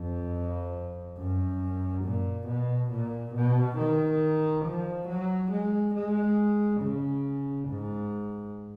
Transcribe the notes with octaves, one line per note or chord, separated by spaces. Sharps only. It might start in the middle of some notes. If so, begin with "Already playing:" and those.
Already playing: F2
F#2
A#2
B2
A#2
B2
D#3
F3
F#3
G#3
G#3
C#3
G#2